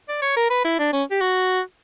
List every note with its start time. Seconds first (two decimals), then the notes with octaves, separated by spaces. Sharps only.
0.09 D5
0.22 C#5
0.37 A#4
0.50 B4
0.65 E4
0.79 D4
0.93 C#4
1.11 G4
1.21 F#4